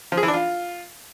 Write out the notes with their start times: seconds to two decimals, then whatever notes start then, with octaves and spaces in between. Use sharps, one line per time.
0.12 F3
0.17 G#4
0.23 E3
0.28 D4
0.34 F4